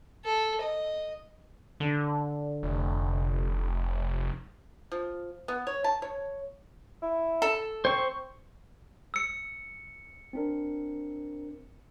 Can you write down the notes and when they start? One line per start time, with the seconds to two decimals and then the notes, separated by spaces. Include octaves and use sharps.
0.25 A4
0.61 D#5
1.80 D3
2.63 F1
4.92 F3
5.48 B3
5.67 C#5
5.84 A5
6.02 C#5
7.02 E4
7.42 A4
7.85 C4 C5 C#6
9.14 E6 C#7
10.33 C4 D4 A#4